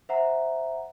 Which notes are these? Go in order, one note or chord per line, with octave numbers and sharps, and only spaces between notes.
C5 E5 F#5 A#5